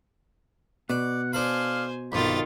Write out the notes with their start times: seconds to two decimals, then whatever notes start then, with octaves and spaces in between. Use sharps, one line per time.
0.90 B2 D5 F#5
1.33 D4 A4 C5 F5 G#5 B5
2.12 B1 G2 D#3 C4 F4 B5 A6